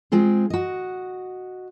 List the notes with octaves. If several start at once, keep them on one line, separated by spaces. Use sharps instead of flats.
G#3 C4 F4 G#4
F#4 D#5